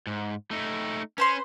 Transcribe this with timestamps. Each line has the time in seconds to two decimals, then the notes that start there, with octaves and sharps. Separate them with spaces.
0.07 G#2
0.51 A3 D#4
1.18 C#4 B4 C5 C6